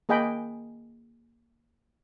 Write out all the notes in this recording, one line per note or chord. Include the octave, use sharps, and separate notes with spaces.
A#3 G#4 D#5 G5 B5